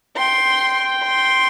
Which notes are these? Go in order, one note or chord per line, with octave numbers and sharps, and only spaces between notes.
G5 C6
C6